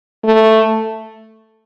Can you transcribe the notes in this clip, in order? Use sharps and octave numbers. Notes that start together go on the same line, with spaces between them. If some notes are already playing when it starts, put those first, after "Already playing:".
A3